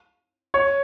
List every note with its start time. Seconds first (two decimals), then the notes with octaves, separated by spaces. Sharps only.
0.54 C#5